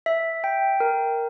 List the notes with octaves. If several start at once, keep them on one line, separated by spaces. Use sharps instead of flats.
E5
G5
A#4